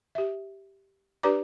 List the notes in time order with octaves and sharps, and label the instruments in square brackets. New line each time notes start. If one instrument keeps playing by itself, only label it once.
[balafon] G4 E5
D4 G4 B4 D5 A#5 D6